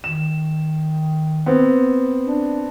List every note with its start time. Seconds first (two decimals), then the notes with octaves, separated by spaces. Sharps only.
0.04 D#3 E7
1.46 B3 C4
2.26 D4